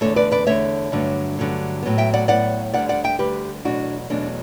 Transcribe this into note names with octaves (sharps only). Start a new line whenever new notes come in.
E2 D3 A3 A4 C#5
B4 D5
B4 D5
E2 D3 A3 C#5 E5
G2 D3 F#3 A3
G2 D3 F#3 A3
A2 F#3 B3
E5 G5
D5 F#5
A2 F#3 B3 D5 F#5
D2 D3 G3 D5 F#5
D5 F#5
E5 G5
D2 D3 G3 G4 B4
E2 B2 F#3 A3 D4 F#4
E2 B2 F#3 A3 D4